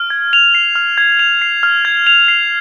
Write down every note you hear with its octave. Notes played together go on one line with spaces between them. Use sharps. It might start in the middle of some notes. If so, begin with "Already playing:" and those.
Already playing: F6
G#6
F7
C7
F6
G#6
F7
C7
F6
G#6
F7
C7